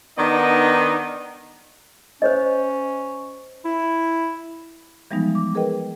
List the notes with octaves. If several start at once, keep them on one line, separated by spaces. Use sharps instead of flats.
D#3 B3 D4 D#4 D#5
C#4 C5 C#5 D#5
E4
E3 F3 G3 G#3 B3 D#4
D6
G#4 A#4 B4 D#5 G5